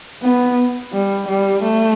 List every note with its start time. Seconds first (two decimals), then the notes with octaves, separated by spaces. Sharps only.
0.23 B3
0.93 G3
1.28 G3
1.64 A3